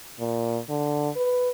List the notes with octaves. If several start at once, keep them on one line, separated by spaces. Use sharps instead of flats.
A#2
D3
B4